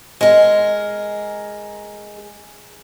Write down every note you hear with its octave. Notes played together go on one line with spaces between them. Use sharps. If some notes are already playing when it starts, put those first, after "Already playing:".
G#3 A#4